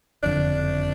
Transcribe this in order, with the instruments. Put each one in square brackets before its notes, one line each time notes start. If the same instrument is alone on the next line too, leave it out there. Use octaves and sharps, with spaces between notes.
[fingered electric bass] F#1 F2 D3 [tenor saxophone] D4